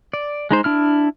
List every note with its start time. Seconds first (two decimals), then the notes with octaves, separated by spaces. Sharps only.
0.13 D5
0.51 G#3 D#4 C5
0.64 D4 E4 F6